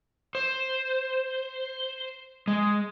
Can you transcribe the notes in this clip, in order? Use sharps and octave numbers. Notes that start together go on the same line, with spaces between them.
C5
G#3